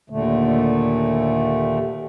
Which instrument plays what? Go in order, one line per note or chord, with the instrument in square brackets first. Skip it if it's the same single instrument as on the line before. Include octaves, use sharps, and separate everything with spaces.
[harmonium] D#2 A#2 D3 A3